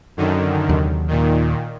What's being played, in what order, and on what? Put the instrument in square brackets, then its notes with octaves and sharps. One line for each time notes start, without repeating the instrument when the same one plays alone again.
[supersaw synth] F#2 D3 D#3
[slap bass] D#2 C3 F#3
[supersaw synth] A#2 D#3